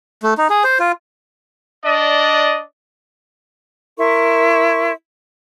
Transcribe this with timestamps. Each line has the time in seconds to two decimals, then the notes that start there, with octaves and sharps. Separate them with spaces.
0.23 A3
0.38 D#4
0.50 G#4
0.64 C5
0.80 F4
1.85 D4 D5 D#5
3.98 E4 A#4 C6 C#6